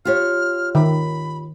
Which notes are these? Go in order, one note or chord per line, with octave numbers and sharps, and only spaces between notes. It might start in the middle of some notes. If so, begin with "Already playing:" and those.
F4 G4 C#5 F6
D#3 B5